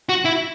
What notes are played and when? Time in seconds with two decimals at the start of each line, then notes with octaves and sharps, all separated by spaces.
0.09 F#4
0.25 E4